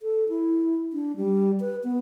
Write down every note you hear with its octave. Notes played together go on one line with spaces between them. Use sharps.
A4
E4
D4
G3
B4
B3